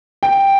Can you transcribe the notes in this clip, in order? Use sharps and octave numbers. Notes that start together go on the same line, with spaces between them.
G5